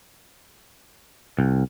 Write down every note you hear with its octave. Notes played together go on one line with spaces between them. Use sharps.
C2